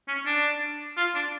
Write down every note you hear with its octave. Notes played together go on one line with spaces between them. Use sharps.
C#4
D4
F4
D4